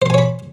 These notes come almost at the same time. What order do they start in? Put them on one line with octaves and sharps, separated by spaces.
C5 C6 G#5 C#5 B5